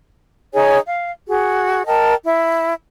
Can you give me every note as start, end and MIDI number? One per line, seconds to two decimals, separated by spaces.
0.54 0.78 63
0.54 0.78 68
0.54 0.78 73
0.54 0.78 80
0.86 1.12 77
1.27 1.85 66
1.27 1.85 68
1.87 2.15 70
1.87 2.15 75
1.87 2.15 79
1.87 2.15 81
2.25 2.73 64